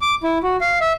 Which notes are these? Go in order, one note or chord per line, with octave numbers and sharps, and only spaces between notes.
D6
E4
F#4
F5
E5